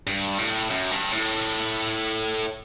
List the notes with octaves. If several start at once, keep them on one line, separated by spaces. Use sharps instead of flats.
G2
A2
F#2
G2
A2